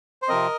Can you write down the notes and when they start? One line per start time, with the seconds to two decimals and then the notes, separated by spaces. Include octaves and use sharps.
0.22 C5
0.28 C3 F3 C4 A#4 D#5